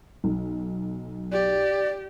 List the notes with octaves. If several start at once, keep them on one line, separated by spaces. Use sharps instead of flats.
B1
G4 D5